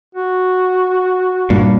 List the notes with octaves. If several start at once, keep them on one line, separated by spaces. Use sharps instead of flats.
F#4
G2 A#2